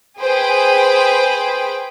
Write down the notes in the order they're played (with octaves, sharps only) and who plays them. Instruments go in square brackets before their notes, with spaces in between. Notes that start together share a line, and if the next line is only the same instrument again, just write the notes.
[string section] G#4 B4 C5 G5